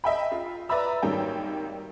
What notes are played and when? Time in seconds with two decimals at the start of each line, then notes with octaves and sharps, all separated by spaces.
0.04 D#5 E5 G5 B5
0.32 F4
0.69 B4 D5 E5 A#5 B5 E6
1.02 G#1 D#3 F#3 G3 A#3 G5